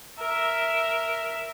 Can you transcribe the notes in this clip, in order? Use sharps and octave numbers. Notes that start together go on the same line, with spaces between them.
A#4 E5